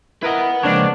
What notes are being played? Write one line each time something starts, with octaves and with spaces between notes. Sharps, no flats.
E4 A#4 B4 D#5 F#5
C#3 F3 G#3 A#3 C4 D4 C#5